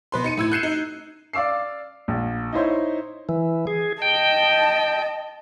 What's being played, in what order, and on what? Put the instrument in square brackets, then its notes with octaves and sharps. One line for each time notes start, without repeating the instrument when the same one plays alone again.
[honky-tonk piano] B2 B4 C6
D#4 C#7 D#7
A2 E6 G#6
F#6 G6 C7 C#7 D#7 E7
D#4
[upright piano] D5 F5 D6 E6 C7
A#1
D#4 E4 C5 C#5
[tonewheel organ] E3
G#4
[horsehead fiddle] D#5 A5 [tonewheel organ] G5